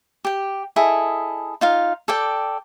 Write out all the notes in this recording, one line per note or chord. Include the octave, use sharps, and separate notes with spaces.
G4 G5
E4 G#4 A4 D#5
D#4 F4 F5
A4 D5 G5